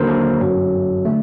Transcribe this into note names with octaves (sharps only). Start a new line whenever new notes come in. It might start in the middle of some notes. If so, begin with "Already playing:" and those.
Already playing: D#2 D3 F#3 A#3 A#4 C5
A4
G1 F#2 F#3
D3 A3